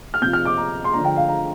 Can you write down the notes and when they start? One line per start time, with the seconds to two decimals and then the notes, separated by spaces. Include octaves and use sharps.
0.14 F6
0.21 C3 F3 C4 F4 G6
0.33 F6
0.45 D6
0.57 A#5
0.84 C6
0.92 D3 F3 D4 F4 A#5
1.05 G5
1.16 F5
1.28 A#5